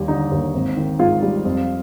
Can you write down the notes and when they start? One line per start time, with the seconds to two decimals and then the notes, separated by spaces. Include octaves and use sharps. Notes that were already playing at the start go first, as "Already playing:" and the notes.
Already playing: D#2 G3
0.08 D3 D#4
0.31 D#2
0.54 G#1
0.77 D#3
0.99 G#2 F4
1.22 G3
1.45 F2